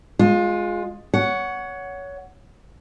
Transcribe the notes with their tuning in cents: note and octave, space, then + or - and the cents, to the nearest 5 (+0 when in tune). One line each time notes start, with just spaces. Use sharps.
G#3 +0 F4 +20
C#5 +20 F#5 +0